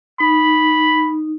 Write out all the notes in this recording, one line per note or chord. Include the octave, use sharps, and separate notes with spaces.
D#4 B5